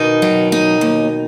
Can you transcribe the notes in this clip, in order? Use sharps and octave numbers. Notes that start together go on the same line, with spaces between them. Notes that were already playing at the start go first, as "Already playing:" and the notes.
Already playing: B2 D#3 D#4
F#3
D#4
D#2